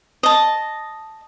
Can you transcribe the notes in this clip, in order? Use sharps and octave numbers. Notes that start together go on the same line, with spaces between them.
D#5 A5